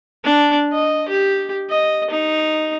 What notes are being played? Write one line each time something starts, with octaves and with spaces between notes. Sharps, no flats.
D4
D#5
G4
D#5
D#4